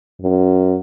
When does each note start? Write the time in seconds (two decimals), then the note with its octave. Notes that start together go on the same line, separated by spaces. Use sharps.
0.22 F#2